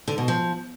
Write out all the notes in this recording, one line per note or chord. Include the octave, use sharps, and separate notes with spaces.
D3
B2
F3